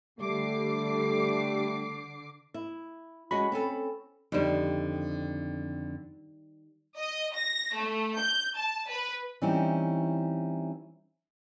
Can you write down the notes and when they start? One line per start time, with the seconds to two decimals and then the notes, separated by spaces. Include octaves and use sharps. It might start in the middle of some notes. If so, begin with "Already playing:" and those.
0.20 D3 G3 A3 D6 C7
2.54 E4
3.31 G#3 C#4 F#4 B5
3.52 C4 C#4 A4
4.32 F2 D3 D#3 G3 C5
6.97 D#5
7.35 A#6
7.75 A3
8.19 G6
8.58 A5
8.89 B4
9.42 E3 G3 C4 C#4 D#4 E4